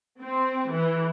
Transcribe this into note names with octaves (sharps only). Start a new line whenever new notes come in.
C4
E3